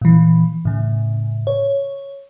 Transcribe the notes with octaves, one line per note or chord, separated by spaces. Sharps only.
A#2 E3
A2 C#3
C#5